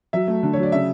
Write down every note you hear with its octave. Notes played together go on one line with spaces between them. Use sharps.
F#3 E5
A3
D3
F#3 C#5
D5
C#3 E5